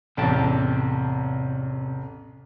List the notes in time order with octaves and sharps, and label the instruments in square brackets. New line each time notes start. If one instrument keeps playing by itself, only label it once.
[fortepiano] A1 E2 [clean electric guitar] C3 G5 A5